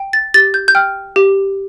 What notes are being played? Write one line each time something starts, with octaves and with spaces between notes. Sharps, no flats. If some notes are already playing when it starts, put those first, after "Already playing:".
Already playing: G5
A6
G4 A6
G6
G6
G5 F6
G4